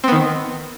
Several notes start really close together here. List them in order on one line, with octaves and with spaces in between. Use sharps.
C4 B3 D#3